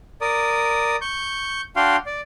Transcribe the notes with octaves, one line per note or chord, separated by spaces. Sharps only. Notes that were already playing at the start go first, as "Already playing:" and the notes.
A#4 D5 D#6
C#6 G6
D4 F#4 F5 G5 C6
D5